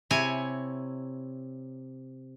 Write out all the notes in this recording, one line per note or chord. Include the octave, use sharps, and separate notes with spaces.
C3 E4 C#5 G#5